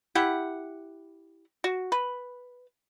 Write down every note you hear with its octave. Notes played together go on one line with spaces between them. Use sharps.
E4 G4 F#5
F#4
B4